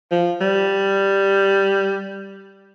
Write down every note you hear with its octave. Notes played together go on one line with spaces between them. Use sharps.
F3
G3